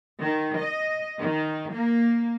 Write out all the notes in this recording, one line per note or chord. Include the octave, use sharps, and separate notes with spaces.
D#3
D#5
D#3
A#3